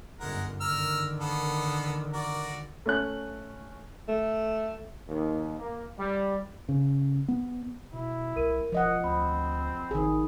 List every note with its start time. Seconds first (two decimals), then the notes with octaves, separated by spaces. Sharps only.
0.20 G1 F#2 G#3 A#4 F#5
0.61 D3 D#3 A#4 E6 F6
1.20 A#3 B3 A4
2.13 F#4 A#4 D5
2.86 A3 C#4 F#6
4.09 A3
5.08 D#2
5.59 A#3
5.98 G3
6.69 C#3
7.28 B3
7.93 B2 E4
8.36 C2 A#4 D#7
8.72 E1 F3 D#5 F#5
9.04 D2 C4 B5
9.91 G#1 D#3 G#4